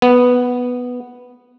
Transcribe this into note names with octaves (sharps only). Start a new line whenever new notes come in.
B3